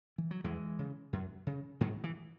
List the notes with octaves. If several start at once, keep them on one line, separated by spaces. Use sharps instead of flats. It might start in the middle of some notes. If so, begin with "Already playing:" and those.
E3
F#3
E2 E3 G#3
C#3
F#2
C#3
G#2 D#3 F#3
E3